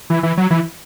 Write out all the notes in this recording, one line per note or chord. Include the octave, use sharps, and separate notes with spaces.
E3
E3
F#3
E3